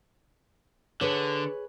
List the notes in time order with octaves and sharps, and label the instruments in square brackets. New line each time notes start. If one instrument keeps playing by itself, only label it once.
[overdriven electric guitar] D3 [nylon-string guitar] G#4 B4 C#5